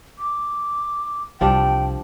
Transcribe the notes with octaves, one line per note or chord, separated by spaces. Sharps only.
D6
C2 F3 G3 D4 G5